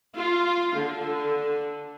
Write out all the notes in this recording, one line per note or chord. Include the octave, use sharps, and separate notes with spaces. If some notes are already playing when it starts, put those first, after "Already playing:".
F4
D3